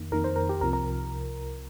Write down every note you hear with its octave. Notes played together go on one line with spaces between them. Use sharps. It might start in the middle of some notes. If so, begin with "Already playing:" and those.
Already playing: F2 D#3 A#3
F2 D#3 A#3 A#4
C5
A#4
G4
C2 C3 F3 A#4
A#4